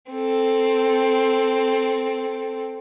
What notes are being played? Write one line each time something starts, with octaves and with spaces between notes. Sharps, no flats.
C4 A4